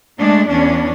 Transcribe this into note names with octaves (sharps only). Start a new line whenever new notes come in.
G#3 A3 D4
E2 C#4 D4